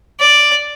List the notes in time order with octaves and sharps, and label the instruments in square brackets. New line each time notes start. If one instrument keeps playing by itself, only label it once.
[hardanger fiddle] D5